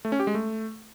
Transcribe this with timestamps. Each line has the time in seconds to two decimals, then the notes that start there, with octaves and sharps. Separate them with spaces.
0.05 A3
0.12 C#4
0.20 G4
0.27 G#3
0.35 A3